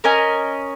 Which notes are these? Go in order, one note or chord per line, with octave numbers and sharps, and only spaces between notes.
C#4 A#4 D#5 G#5